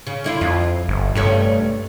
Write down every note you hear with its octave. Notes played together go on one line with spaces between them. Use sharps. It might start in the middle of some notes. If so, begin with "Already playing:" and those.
C#3
D3 E4 F4
F2 F4
G1
G2 C3 A3 C#4